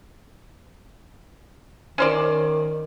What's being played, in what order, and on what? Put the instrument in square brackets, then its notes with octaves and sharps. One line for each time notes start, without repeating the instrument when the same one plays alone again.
[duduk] D#3 [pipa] C#4 C5 D5